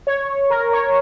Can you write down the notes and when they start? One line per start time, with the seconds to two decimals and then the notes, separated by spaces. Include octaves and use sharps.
0.07 C#5
0.50 A#4
0.73 C#5